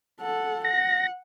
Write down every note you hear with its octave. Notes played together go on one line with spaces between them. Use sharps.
A4 F#5
F#5 A#6